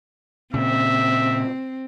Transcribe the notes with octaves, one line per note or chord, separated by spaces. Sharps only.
A#2 C#3 C4 E5